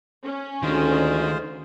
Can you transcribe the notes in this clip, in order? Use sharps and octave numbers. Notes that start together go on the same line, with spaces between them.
C#4
D2 D#3 G#3 F4 C5